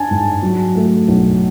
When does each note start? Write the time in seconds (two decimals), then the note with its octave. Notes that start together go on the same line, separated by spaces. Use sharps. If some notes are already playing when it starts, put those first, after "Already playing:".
Already playing: D4 G#5 A5
0.11 G#2
0.42 F#3
0.76 A3
1.08 B1